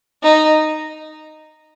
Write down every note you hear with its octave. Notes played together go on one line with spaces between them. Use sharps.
D#4